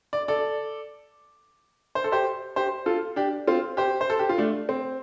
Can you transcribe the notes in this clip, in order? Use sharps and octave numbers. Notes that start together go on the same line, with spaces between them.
D5
A4 D5
C5
A4
G4 C5
G4 C5
F4 A4
D4 G4
C4 F4
G4 C5
C5
A4
G4
F4
A3 D4
C4